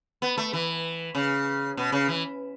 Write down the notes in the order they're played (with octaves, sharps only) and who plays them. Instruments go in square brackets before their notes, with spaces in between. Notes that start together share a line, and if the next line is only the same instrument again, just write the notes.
[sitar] B3
A3
E3
C#3
B2
C#3
E3